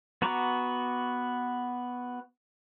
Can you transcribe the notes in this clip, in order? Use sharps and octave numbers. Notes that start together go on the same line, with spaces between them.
B3 F#4 A#5 C#6 D6